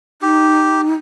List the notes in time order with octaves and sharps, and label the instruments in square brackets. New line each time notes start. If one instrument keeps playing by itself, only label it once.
[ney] D#4 [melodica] G4